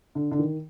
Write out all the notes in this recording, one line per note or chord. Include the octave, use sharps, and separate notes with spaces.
D3
D3
D#3